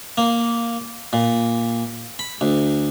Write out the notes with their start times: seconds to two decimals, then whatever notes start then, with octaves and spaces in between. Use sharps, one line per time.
0.18 A#3
1.13 A#2
2.19 B5
2.41 D2